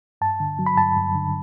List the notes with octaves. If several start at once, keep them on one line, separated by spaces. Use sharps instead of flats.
G2 A5
D3
F#3
B5
G2 A5
G2
D3